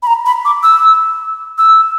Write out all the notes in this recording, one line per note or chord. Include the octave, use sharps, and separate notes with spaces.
B5
A#5
B5
D6
E6
E6